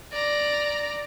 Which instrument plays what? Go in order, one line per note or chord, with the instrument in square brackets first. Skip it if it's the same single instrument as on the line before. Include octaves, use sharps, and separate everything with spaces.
[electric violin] D5 A#5